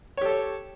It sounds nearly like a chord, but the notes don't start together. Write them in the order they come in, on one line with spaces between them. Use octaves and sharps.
C#5 G4 A4